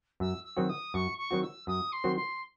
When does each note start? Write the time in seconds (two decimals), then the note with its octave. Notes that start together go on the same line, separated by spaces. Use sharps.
0.20 F#2 E6
0.44 E6
0.57 D#3 F#3 C4 F#4
0.69 D#6
0.94 F#2 C#6
1.18 C#6
1.31 D#3 F#3 C4 F#4
1.42 E6
1.67 F#2 D#6
1.92 C6
2.04 D#3 F#3 C4 F#4
2.16 C6